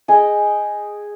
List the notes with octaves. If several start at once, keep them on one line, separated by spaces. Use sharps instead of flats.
G#4 D#5 G5 G#5